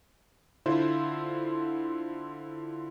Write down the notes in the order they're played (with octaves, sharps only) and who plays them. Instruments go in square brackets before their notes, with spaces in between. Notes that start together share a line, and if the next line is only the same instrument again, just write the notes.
[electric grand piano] D3 E4 F4 C5